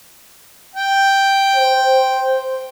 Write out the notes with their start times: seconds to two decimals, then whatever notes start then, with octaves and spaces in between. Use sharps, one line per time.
0.76 G5
1.55 C5